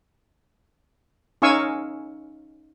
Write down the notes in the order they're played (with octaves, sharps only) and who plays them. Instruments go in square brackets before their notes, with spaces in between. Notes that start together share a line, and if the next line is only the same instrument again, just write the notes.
[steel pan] C#4 D#4 F5 G#5 C#6 E6